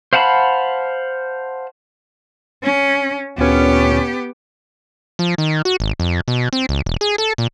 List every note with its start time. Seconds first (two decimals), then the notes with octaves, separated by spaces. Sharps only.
0.13 C5 F5 F#5 A5 B5
2.64 C#4
3.38 D2 A#2 B3 C#4 G4
5.19 F3
5.38 D#3
5.65 F#4
5.80 G#1
6.00 F2
6.28 B2
6.53 C4
6.69 C#2
6.86 E1
7.01 G#4
7.18 A4
7.38 A#2